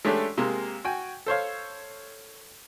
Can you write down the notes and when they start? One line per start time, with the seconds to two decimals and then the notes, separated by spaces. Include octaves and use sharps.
0.05 G#3 A3 C#4 D4 G4 A4
0.38 C3 G#3 A#3 G#4
0.85 F#4 G5 G#5
1.26 A4 C5 C#5 F5